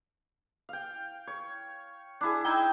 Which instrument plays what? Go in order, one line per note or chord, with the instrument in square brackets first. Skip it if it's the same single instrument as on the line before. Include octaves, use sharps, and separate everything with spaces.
[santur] F5 G5
C#5
D4 E4 G#4
[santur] D#4 [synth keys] G5 E6 G#6